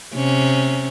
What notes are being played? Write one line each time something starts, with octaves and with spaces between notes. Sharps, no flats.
C3 C#4